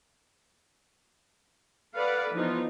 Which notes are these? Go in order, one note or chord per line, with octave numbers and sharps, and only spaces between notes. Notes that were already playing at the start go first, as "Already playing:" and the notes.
A4 B4 D5 F5 F#5
E3 F3 B3 D#4 F4